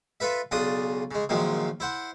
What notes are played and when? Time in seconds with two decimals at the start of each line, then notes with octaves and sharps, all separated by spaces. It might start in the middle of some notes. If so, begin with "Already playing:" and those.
0.20 F4 A4 B4 E5
0.51 B1 C#3 D4 F4 D5 D#6
1.11 C#3 G#3
1.29 F#2 A#2 D#3 F3 G#3
1.80 E4 C5 F#5